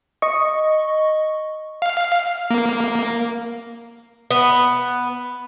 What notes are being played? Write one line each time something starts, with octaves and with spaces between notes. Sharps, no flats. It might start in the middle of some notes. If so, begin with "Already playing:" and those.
D#5 C#6
F5
A#3
B3